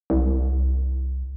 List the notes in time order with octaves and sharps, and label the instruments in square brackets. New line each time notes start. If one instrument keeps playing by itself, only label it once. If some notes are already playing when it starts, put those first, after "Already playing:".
[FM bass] C2